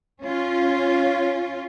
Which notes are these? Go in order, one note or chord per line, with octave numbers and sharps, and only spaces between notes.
C#4 F4